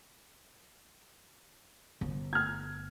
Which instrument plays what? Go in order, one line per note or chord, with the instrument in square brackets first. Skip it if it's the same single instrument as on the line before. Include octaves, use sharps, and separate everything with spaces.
[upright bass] G1
[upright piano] F6 G#6